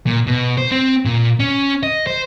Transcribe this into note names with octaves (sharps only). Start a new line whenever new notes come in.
A#2
B2
C5
C4
A#2
C#4
D#5
C5